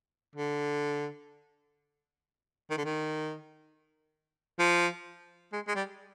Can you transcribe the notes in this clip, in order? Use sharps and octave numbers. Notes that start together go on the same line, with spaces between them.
D3
D#3
D3
D#3
F3
G#3
G#3
G3